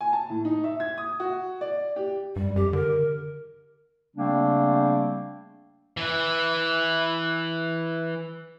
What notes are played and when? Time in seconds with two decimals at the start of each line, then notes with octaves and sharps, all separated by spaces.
0.01 G#5
0.13 A5
0.30 A2
0.45 D#4
0.64 E5
0.80 G#6
0.98 D#6
1.20 F#4
1.61 D5
1.96 G4
2.36 G2 G3
2.56 F#2 G4
2.73 D3 A#4
4.16 C#3 G3 A3 A#3 C4 D4
5.97 E3 B4